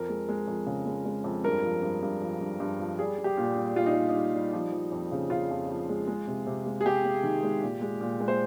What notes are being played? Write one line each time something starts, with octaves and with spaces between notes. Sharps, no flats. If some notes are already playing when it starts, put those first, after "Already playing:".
Already playing: F2 A#4
G#3
G#3
F2
C#3
G#3
G#3
F2
G2 A#4
F3
G2
G2
F3
G2
G2
F3
G3 G#4
G3
G4
A#2
G3
G3 F4
D#4
G3
D#4
G3
G3
F3
F3
F2
C#3
C#3 F4
F2
F3
G#3
G#3
C3
C3
G#3
G#4
G#3 G4
G#3
D#3
G#3
A#2
G#3
A#2
G#3
C5